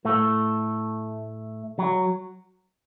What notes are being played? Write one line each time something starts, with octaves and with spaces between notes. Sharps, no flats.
A2 A3
F#3